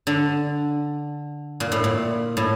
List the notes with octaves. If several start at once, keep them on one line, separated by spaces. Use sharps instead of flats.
D3
A#2
A2
A#2
A2